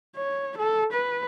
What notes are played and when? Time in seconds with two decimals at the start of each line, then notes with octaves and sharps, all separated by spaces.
0.16 C#5
0.58 A4
0.93 B4